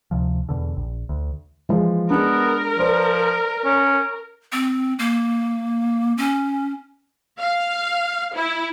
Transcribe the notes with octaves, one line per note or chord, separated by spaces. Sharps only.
D2 C3 F3
E2 B2 D3
A#1
D2
E3 F3 G#3
G#3 B3 D4 A#4
F3 B4 C5 D5
C#4
C4
A#3
C#4
F5
E4